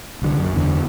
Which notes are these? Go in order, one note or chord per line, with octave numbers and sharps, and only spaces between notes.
C2 D3
F#2
E2 D3 D4